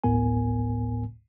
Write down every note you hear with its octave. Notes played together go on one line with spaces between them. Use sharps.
G#1 D2 A2 B3 A#4 G#5